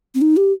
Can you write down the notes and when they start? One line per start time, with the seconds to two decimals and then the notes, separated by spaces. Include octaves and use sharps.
0.15 C4
0.21 D#4
0.37 G4